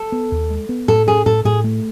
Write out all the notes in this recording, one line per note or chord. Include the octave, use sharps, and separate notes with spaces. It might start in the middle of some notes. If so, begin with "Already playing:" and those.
Already playing: A4
B3
D#2
G#3
B3
A2 A4
C#4 G#4
A2 A4
A2 G#4
A3